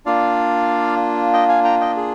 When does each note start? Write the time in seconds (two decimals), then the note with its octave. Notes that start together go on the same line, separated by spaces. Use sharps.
0.06 A#3 D4 F4 D5 F5
1.33 D#5 G5
1.49 F5 G#5
1.64 G5 A#5
1.81 D#5 G5
1.96 G#4